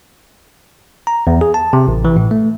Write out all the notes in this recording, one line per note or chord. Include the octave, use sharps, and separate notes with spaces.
A#5
E2
G#4
A5
C3
A1
E3
A2
A3